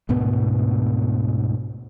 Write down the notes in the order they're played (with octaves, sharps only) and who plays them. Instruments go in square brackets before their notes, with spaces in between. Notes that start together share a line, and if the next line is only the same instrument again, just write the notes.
[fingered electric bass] D2 G#2 B2 B3